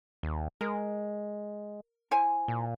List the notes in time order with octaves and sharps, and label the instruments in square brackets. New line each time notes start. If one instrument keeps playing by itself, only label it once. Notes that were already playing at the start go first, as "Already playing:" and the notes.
[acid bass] D#2
[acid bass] G#3 [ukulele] A#4
[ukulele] E4 C5 G#5
[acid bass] A#2